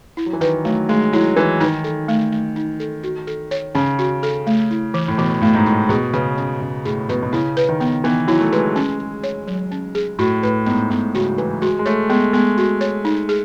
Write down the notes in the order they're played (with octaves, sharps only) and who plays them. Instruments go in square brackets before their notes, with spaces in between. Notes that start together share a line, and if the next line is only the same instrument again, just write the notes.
[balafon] E4
[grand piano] F#3
E3
[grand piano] D#3 [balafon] B4
[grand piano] F#3 [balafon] A3
[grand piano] G#3 [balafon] A3
[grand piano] F#3 [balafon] E4
[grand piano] E3 [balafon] B4
[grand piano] D#3 [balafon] D#4
[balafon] A4
A3
A3
D#4
A4
F#4
A4
C#5
[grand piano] C#3 [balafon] C#4
[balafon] F#4
A4
A3
E4
E3
[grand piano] A2
[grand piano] B2 [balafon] E3
[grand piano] A2 [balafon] A3
[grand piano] G#2
[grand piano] A2 [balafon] E4
[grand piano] B2 [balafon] G#4
[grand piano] C#3 [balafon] B4
[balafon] C#4
[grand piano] C#3 [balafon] C#4
[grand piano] A2 [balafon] G#4
[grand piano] B2 [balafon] B4
[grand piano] B2
[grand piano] C#3 [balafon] E4
[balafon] B4
[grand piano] D#3
[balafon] B3
[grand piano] E3 [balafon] B3
[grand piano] F#3 [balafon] E4
[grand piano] A3
[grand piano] G#3 [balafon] B4
[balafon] C#4
G#4
C#5
F#3
C#4
G#4
[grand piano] A2 [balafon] F#4
[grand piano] A2 [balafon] B4
[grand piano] G#2 [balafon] B3
[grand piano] A2 [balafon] B3
[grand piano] C#3 [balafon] F#4
[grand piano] F#3
[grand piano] E3 [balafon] B4
[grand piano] G#3 [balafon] F#4
[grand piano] G#3
[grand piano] A3 [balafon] C#5
[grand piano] G#3 [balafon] B3
[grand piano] G#3 [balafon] B3
[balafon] F#4
C#5
D#4
G#4